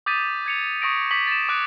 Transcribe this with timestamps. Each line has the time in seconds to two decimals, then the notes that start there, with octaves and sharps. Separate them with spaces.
0.06 D6 D#6 G6 A6 B6 D#7
0.46 G#6 C#7 F7
0.82 C#6 D#6 A#6 D7
1.11 D6 B6 F#7
1.27 A6 E7
1.49 D6 D#6 F#6 D7